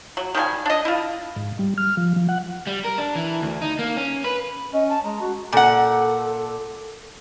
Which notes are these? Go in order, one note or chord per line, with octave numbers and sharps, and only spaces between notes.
F#3
D#3 F3 G3 G#5
D4 D#5
E4 F4
G#2
G3
F6
F3
F3
F#5
G3
A#4
D4
E3
D2
D#4
A#3
C#4
B4
C#4 D#5
A5
G#3 A#5
F#4
A#2 A4 F#5